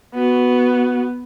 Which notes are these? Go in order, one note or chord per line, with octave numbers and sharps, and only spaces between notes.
B3 F#4